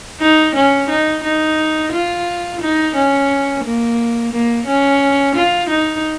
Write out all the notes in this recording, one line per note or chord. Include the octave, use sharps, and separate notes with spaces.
D#4
C#4
D#4
D#4
F4
D#4
C#4
A#3
A#3
C#4
F4
D#4